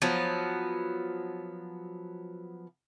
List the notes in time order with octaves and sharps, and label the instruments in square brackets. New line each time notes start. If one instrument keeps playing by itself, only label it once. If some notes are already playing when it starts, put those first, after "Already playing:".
[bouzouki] F3 F#3 B3